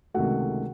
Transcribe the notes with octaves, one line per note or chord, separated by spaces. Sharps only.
C#2 C3 D#3 A3 F#4 F#5